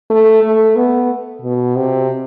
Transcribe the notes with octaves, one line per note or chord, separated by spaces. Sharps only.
A3
A3
B3
B2
C3